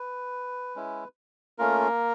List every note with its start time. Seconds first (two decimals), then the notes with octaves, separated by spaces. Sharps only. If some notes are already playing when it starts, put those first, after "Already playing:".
Already playing: B4
0.76 G#3 C#4 E4
1.58 A3 A#3 C#4 F4 A#4